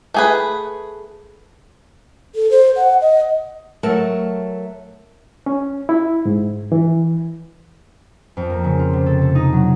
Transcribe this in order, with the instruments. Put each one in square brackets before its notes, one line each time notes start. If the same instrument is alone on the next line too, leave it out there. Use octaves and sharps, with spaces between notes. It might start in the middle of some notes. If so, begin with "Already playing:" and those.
[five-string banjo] A3 G#4 B4
[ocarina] A4
C5
F#5
D#5
[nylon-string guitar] F#3 A3 A#4 A5
[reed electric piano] C#4
E4
G#2
E3
[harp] F2
A#3
C#3
F4
C3
A4
A4
D#4
F#3